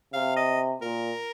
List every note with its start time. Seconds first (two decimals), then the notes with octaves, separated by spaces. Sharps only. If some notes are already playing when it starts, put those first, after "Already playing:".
0.14 C3 F5
0.36 D#5
0.82 A#2 A#4